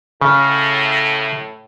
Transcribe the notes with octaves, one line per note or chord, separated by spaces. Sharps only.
A2 C#3